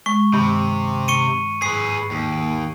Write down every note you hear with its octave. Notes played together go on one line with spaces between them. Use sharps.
G#3 C#6
G2 C3 D#3
C#6 C#7 D#7
G#2 G#4 B4 C7
D#2